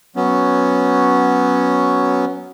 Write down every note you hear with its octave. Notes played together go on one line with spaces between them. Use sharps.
F#3 B3 C#4